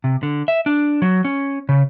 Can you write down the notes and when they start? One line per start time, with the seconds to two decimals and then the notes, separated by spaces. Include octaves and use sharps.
0.04 C3
0.23 D3
0.48 E5
0.66 D4
1.02 F#3
1.25 C#4
1.69 C#3